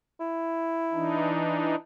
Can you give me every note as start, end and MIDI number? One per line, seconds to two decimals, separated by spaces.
0.20 1.48 64
0.92 1.75 52
0.92 1.75 62
0.92 1.75 63